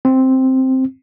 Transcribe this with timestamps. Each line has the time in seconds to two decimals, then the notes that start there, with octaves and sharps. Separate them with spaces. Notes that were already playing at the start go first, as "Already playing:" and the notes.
0.05 C4